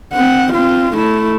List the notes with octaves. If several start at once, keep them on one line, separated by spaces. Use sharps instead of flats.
C4 F#5
C4 F4
A3 E4